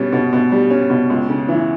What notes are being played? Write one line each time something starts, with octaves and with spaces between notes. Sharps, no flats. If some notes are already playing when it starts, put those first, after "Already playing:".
Already playing: B2 G3 C#4
B2
B2
G3
C#4
B2
C#2
C#3
E3